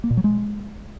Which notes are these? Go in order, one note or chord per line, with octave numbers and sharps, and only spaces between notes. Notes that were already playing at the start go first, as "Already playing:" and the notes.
A#3
A#2
F#3
G#3